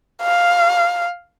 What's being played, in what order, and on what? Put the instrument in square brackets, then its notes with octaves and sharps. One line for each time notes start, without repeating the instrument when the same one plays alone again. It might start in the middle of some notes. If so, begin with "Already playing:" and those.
[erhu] F5